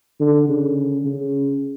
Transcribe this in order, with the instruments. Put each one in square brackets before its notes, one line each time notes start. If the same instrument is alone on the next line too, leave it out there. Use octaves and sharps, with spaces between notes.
[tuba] D3
C#3
C#3